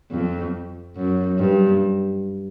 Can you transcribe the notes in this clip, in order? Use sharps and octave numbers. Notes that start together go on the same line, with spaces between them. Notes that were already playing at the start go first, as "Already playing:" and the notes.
F2
F#2
G2